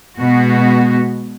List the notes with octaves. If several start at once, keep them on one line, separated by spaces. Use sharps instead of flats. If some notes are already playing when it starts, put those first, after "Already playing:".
B2 G#3 B3 F#4